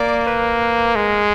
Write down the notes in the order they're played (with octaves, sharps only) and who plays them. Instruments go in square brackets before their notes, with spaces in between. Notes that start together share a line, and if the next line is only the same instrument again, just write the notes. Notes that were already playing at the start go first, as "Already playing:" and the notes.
Already playing: [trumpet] A#3 [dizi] D5
[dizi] B4
[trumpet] G#3 [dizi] A#4